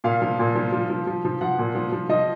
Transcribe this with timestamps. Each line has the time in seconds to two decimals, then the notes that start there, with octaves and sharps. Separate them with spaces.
0.04 A#2 F5
0.22 F3
0.39 A#2
0.55 F3
0.72 F3
0.90 F3
1.07 F3
1.25 F3
1.41 F3 F#5
1.58 A#2
1.75 F3
1.92 F3
2.09 F3 D#5